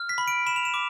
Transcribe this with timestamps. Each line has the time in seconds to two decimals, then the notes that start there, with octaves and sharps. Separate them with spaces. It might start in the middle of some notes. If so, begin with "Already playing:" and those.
Already playing: F6
0.09 B6
0.18 B5
0.28 D7
0.46 B5 E7
0.56 F7
0.65 E7
0.74 D6